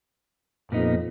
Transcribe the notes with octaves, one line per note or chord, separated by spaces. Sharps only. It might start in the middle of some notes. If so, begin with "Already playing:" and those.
F2 A#2 B3 D#4